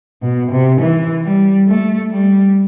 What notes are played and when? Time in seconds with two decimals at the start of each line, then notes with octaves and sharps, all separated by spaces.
0.23 B2
0.52 C3
0.80 E3
1.24 G3
1.67 A3
2.11 G3